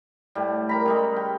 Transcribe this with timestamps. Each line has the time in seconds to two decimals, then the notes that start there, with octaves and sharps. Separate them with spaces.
0.35 A2 G3
0.69 A#4 A#5 B5
0.86 C#3 G3 G#3
1.16 G5